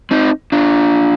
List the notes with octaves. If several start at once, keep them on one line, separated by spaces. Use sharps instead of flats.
C4 D#4
D4 F4